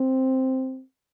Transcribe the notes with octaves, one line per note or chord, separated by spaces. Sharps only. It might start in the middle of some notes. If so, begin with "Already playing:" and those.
Already playing: C4